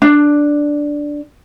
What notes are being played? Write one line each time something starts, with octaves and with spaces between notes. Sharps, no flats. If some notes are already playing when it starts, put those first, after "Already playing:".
D4